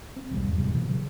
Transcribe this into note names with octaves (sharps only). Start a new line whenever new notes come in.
C4
B1 E2 E3 G3
E2 G2
G#1 E2 C3 G3
A#2 E3
C#3 F#3